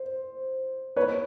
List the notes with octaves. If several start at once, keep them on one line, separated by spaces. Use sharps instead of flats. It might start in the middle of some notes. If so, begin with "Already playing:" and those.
Already playing: C5
B4 C#5